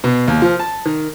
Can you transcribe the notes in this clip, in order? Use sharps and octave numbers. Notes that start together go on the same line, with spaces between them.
B2
D#2
F3
A5
D#3